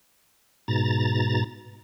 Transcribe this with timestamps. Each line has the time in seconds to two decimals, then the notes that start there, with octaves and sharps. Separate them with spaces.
0.68 G#2 B2 A#5 A6